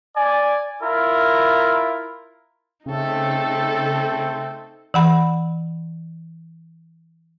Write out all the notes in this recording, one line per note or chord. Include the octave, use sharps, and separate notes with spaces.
D5 G#5
E4 F4 A#4
C#3 A3 C4 D#4 A4
E3 F#5 B5